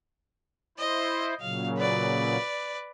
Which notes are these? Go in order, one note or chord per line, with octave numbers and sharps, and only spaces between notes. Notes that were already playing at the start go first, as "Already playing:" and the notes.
E4 C5 D#5
A#2 C#3 F#3 F5
B4 D5